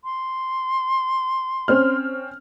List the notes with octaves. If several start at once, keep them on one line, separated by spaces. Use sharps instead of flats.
C6
C4 C#4 F6